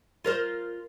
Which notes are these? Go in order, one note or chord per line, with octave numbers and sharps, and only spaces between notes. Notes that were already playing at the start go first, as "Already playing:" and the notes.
F4 A#4 C5